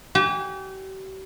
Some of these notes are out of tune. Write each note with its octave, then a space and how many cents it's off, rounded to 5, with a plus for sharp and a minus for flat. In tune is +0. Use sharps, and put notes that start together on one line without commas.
G4 -40 G#5 -45